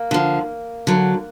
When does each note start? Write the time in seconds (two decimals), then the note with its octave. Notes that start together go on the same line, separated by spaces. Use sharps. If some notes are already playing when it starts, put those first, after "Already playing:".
Already playing: A#3
0.11 D3 F3
0.87 D3 F#3